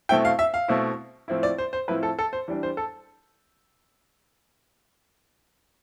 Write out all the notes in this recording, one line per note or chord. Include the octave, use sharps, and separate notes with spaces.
B2 A3 C4 E4 G5
F5
E5
F5
B2 A3 C4 E4
A2 F3 C4 E4
D5
C5
C5
A2 F3 C4 E4 B4
A4
A4
C5
E3 G3 D4
C5
A4